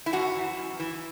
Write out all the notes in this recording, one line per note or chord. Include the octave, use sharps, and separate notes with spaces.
E4
F#2 F#4
E3
F#2
E3